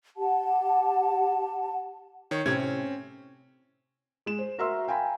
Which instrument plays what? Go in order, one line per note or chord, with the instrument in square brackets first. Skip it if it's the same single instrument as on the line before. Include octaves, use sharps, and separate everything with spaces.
[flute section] G4 F#5 A5
[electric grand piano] D#3 C#5
[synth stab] A2 C3 [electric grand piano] C4 C#4 G#6
[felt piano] G#3 E7
C5
F#4 A#4 E5 A#5 C6 E6
F5 G5 G#5 A#5 B5